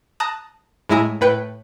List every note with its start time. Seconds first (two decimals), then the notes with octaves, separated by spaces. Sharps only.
0.20 A5 A#5 D#6 F#6
0.89 A2 G#3 E4 G#5 A#5 D#6
1.21 A2 B4 G5 C#7